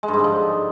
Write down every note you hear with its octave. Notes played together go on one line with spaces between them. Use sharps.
G#3
G2
G#2
D3
F3